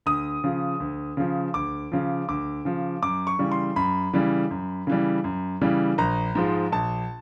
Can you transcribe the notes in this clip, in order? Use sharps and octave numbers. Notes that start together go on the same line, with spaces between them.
D2 D#6
C#3 F3
D2
C#3 F3
D2 D6
C#3 F3
D2 D6
C#3 F3
F#2 D6
C#6
C#3 E3 G3
C6
F#2 B5
C#3 E3 G3
F#2
C#3 E3 G3
F#2
C#3 E3 G3
A#1 A#5
G#2 F3 G#3
A#1 A5